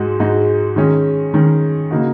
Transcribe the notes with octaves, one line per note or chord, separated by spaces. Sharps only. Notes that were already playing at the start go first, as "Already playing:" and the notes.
Already playing: G#2 G#3 D#4 F#4
G#2 G#3 D#4 F#4
D#3 G#3 C#4
D#3 G#3 C#4
C#3 A#3 D#4 F#4